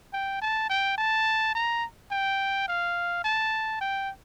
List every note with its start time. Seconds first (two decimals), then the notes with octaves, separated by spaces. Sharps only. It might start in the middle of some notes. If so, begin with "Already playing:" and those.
0.13 G5
0.42 A5
0.70 G5
0.98 A5
1.55 A#5
2.11 G5
2.68 F5
3.24 A5
3.81 G5